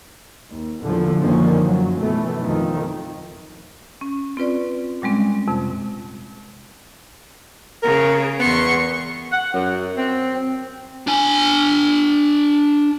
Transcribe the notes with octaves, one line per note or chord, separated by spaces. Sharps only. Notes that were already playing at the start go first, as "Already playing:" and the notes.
D#2
E2 A#2 D3 F3
F#2 D3 D#3 F3 A#3 C#4
F#2 F#3
B2 E3 A3 B3
F2 D#3 F3
C#4
C4 F4 B4 D5
A#2 G3 G#3 C4 C#4
F2 C3
C#3 A#4
E2 B3 C6 C#6
F#5
F#2
C4
D4 G#5